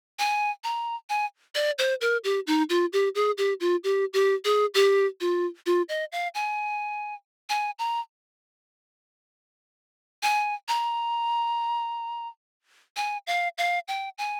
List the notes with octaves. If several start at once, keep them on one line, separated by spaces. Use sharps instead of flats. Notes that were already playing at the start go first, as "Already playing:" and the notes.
G#5
A#5
G#5
D5
C5
A#4
G4
D#4
F4
G4
G#4
G4
F4
G4
G4
G#4
G4
F4
F4
D#5
F5
G#5
G#5
A#5
G#5
A#5
G#5
F5
F5
G5
G#5